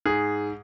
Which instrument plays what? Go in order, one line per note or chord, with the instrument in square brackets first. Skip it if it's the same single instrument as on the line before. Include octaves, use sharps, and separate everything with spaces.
[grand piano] G#2 G#4